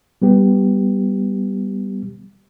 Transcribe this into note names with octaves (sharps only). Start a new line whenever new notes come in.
G3 B3 G4